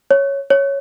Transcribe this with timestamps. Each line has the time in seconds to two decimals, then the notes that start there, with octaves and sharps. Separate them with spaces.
0.11 C#5
0.50 C#5